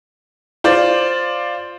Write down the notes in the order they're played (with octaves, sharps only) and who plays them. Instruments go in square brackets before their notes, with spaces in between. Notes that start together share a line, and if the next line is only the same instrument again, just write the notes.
[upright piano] F4 C5 D5